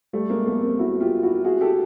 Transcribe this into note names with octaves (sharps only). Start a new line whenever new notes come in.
G3 A3
G#3 A#3
A3 B3
A#3 C4
E4 F#4
F4 G4
E4 F#4
F#4 G#4
G4 A4